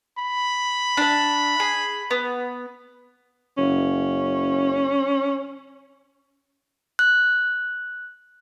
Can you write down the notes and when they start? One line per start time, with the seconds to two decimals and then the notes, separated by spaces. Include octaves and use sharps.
0.18 B5
0.97 D4 E5
1.60 G#4
2.11 B3
3.58 F#1 C#4
6.99 F#6